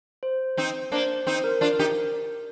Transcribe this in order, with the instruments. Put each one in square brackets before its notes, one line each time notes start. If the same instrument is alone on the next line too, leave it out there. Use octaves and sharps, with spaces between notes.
[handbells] C5
[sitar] C4 D#4
[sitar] A#3 D4 [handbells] C5
[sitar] C4 D#4 [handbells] C5
[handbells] A#4
[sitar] D4 F4
D#4 G4